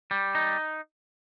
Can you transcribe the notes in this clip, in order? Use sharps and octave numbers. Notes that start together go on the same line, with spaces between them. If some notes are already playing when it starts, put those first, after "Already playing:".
G3
D#4